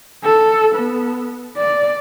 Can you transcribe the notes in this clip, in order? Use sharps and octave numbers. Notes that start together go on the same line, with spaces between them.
A4
B3
D5